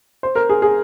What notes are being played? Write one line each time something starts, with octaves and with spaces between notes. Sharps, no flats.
C5
A#4
G#4
G#4